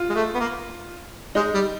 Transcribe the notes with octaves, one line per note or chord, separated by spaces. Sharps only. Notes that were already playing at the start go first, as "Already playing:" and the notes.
Already playing: F4
G#3
A3
B3
A#3
G#3 D#4
G3